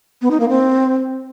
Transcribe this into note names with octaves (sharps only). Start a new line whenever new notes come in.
B3
D#4
A#3
C4